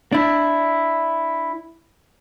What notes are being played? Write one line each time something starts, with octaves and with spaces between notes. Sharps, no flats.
D4 E4